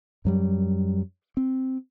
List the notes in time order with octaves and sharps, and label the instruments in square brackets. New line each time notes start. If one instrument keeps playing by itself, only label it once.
[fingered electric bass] F#2 F#3 G3
C4